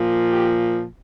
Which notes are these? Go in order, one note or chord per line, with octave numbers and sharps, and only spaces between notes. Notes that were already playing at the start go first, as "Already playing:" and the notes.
Already playing: A#2 F3
G4